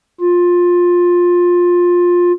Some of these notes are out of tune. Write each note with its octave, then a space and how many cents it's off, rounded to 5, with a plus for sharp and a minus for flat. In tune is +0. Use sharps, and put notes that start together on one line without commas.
F4 +15